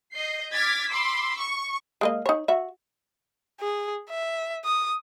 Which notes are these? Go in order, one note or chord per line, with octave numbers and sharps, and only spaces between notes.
D#5 G6 C7
D6 F6 G#6 A6 B6
B5 C6 D6 E6
C#6
G#3 A#3 D#5
D#4 C#5
F#4 E5
G#4
E5
D#6